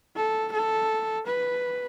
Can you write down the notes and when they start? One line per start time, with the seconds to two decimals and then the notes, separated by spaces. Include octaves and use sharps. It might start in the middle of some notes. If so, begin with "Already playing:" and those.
0.16 A4
0.52 A4
1.27 B4